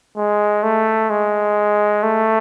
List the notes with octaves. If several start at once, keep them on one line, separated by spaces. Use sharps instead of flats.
G#3
A3
G#3
A3